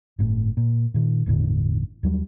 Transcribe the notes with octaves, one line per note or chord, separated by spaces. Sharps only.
G1 A2
A#2
A#2 D#3
G1 E2 A2 D3
D#2 F#3 G3